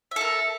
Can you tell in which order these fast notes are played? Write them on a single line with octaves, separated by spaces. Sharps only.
E5 A4 A#4